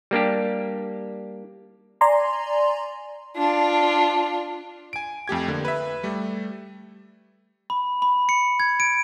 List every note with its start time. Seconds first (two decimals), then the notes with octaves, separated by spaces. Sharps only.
0.11 G3 A#3 D4 G4
2.01 D5 G#5 A#5 C6
3.37 D4 F4
4.93 G#5 D7
5.28 F2 A3 G4 G#6
5.48 D3 A#3
5.65 B4 E5
6.03 G3 A3
7.70 B5
8.02 B5
8.29 C#7
8.60 G#6
8.80 D7